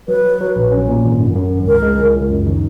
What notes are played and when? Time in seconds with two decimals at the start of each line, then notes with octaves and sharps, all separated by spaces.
0.08 F#3 B4
0.24 F#3
0.41 F#3
0.56 A#1
0.72 C#4
0.88 A#2
1.04 G#1
1.20 F#2
1.35 F#2
1.52 G#1
1.67 C#2 A#4
1.82 G#3
1.99 C#2
2.15 C#2
2.30 F#2
2.46 D#3